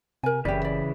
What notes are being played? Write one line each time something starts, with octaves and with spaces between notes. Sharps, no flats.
C3 A#4 G#5
F#1 C#3 E3 E4 G4 D5
D5